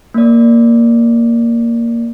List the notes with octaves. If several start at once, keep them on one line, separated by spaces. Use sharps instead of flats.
A#3 D5